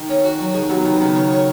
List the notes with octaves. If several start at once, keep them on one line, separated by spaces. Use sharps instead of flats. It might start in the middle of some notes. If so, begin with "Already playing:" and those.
Already playing: D#3
C#4
F#4
F#3
D#3 G#4
F#3 B3
D#3 B3
C#3 B3
C#5
C#5